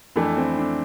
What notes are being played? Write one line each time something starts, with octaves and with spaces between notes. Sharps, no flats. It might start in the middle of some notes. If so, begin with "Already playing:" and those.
F2 E3 A3 D4 E4
C4
D4